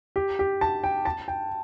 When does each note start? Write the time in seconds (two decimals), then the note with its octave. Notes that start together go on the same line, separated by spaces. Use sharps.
0.16 G4
0.39 G4
0.61 A5
0.84 G5
1.05 A5
1.28 G5